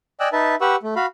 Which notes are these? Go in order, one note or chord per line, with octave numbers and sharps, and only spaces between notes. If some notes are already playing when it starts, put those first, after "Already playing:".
D5 D#5 G5 G#5 E6 F#6
D#4 B4 E5 A5
G4 B4 F#5 C#6 E6
A3
F#4 F5 B5